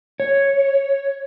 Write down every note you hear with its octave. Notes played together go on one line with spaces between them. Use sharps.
C#5